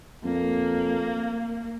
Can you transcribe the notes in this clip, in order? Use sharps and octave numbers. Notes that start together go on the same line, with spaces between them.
F2 A#3